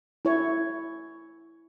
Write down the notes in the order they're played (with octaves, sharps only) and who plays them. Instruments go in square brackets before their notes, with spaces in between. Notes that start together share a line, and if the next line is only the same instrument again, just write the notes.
[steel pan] E4 C#5